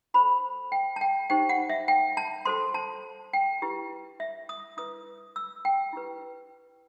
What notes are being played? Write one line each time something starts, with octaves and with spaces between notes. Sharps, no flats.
F#4 A4 C5 B5
G5
A5
G5
D#4 G4 C5 G5
F#5
E5
G5
A5
F#4 A4 C5 C6
A5
G5
E4 G4 B4
E5
D#6
E4 B4 D#6
E6
G5
E4 G4 B4